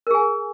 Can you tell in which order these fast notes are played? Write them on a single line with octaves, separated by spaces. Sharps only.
A#4 G#4 G#5